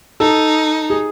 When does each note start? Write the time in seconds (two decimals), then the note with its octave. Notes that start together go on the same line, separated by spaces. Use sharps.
0.20 D#4 A4
0.90 G#4